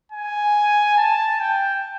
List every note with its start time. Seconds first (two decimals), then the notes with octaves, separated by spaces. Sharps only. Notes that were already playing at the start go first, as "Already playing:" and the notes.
0.12 G#5
0.98 A5
1.40 G5